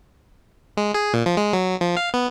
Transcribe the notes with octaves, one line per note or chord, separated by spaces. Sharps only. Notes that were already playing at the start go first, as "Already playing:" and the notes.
G#3
G#4
A#2
F3
G#3
F#3
F3
F5
B3